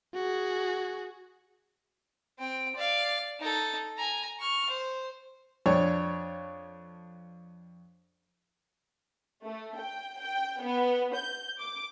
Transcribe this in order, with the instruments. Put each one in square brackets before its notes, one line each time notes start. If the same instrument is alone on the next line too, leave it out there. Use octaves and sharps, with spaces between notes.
[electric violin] F#4 G#4
[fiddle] C4 G5
D5 F5
D#4 A4
G#5 A#5
C#6 F6
C5
[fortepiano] F2 D4 C#5
[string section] A3
G5
G5
B3
G6
D6